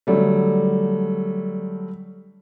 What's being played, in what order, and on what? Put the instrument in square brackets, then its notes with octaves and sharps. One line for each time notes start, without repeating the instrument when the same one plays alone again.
[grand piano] D3 F#3 G3 A3